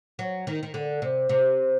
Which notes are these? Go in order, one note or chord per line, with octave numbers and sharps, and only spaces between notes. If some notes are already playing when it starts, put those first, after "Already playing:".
F#3
D#3
D#3
D3
C3
C3